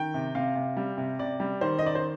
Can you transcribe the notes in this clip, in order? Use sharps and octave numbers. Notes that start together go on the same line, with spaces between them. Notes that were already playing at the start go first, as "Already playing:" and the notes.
Already playing: D#3 G5
C3
C3 F5
C3
G3
C3
C3 D5
G3
D#3 C5
D#5
D#3 D5
C5